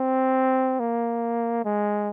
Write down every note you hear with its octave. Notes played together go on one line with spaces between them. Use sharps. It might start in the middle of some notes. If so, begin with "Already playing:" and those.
Already playing: C4
A#3
G#3